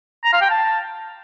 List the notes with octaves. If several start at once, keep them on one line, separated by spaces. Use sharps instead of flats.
A#5
F5
G5
A5